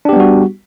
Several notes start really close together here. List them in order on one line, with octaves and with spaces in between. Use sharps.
D4 G4 B3 G3 F#4